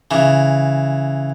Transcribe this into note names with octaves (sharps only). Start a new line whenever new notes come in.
C#3 E3